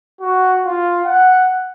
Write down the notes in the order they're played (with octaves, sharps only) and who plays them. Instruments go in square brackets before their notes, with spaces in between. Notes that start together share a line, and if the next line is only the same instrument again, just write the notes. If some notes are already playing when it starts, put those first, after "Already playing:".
[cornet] F#4
F4
F#5